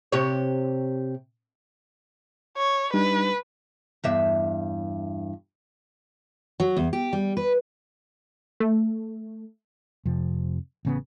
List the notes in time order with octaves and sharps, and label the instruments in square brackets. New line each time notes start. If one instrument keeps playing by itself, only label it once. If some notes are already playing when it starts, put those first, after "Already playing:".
[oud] C3 G4 C#5
[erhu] C#5
[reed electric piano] G3 D4 D#4 [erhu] B4
[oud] E2 G2 E5
[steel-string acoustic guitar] F#3
E2
G4
G3
B4
[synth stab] A3
[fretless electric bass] F2 C3 F3
A1 C#3 B3